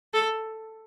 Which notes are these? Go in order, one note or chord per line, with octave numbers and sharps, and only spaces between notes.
A4